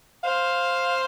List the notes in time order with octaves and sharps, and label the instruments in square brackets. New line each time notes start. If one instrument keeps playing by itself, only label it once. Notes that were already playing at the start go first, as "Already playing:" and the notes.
[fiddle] C5 [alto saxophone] F5